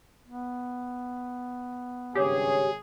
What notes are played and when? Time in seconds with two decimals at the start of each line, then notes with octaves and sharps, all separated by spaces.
0.27 B3
2.15 G#1 G2 C#3 G4 G#4 C#5